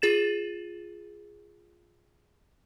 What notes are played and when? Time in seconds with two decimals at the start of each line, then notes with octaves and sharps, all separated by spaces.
0.02 F4 G#4 A6 E7